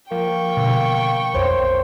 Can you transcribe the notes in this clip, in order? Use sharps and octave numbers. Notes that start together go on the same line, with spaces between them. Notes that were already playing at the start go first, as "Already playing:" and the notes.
F3 A#3 G5 C#6
B2 D3
B1 F2 C5 C#5